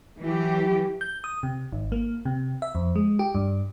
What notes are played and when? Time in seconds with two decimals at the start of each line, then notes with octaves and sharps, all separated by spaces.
0.23 E3 F#3 G4
1.01 G6
1.24 D#6
1.43 C3
1.73 G#1
1.92 A#3
2.25 C3
2.62 E5
2.75 F2
2.95 G#3
3.19 G4
3.35 G2